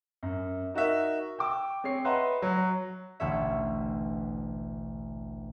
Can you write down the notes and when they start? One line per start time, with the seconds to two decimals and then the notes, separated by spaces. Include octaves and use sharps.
0.23 F#2
0.74 D#4 F#4 A#4 E5
1.39 G5 D6 E6
1.84 C4 G#4 C#5 C7
2.05 B4 D#5 E5 F#5 A#5 C6
2.42 F#3
3.20 A1 D2 B2 C#5 E5